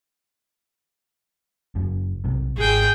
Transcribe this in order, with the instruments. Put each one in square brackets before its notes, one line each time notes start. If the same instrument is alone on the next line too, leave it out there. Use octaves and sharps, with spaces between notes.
[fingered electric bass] F#1 F#2
B1 C3
[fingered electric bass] G#1 [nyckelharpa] G#4 G5